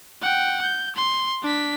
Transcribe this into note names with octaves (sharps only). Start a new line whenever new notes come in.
F#5 G5
G6
C6
D4 B6